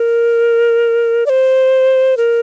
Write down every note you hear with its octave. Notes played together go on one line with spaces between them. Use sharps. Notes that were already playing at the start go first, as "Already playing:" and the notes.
Already playing: A#4
D5
C5
A#4